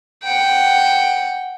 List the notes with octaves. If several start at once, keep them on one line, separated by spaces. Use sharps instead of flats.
F#5 G5